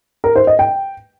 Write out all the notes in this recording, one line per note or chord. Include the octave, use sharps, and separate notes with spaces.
A#4
C5
D#5
G5